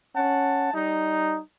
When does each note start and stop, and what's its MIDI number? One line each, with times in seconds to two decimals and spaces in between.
0.15 0.73 61
0.15 0.73 78
0.15 0.73 81
0.73 1.39 55
0.73 1.39 63